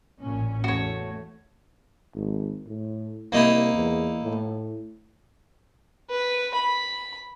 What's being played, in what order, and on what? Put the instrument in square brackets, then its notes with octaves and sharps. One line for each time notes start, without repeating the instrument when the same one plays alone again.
[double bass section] A1 A#2 C#4
[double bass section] E2 A3 [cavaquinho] F#4 C#5
[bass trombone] G#1
A2
[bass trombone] C2 [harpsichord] A#3 D#4 E4
[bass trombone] E2
A2
[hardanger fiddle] B4
B5